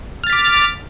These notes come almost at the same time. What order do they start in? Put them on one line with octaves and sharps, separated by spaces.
F6 A6 B6 D6